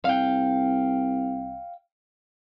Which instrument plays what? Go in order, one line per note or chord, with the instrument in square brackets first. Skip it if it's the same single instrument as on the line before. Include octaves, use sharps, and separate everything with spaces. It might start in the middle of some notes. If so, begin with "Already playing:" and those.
[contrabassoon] C2 [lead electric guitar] F5 G5